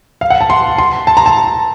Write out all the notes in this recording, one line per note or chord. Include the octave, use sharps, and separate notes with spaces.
F5
F#5
A5
C6
C6
A5
A#5
A5